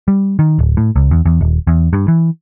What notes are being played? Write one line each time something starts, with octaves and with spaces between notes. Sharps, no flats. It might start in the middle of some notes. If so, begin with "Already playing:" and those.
G3
D#3
D1
A2
C#2
E2
E2
D#1
E2
G2
E3